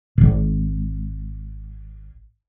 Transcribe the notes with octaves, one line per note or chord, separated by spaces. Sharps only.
D1 G#1